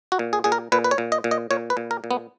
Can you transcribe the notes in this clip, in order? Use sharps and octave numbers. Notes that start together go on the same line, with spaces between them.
F#4
A#2
G#4
A#2 G#4
A#4
A#2 B4
B4
C#5
A#2
D#5
A#2
D#5
A#2 C#5
B4
A#2
A#4
A#2
B3